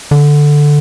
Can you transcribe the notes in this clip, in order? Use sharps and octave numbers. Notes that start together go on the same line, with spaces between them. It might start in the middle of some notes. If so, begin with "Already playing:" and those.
D3